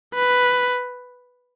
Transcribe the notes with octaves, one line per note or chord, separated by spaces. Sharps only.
B4